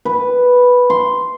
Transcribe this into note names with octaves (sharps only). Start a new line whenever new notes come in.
B4
C6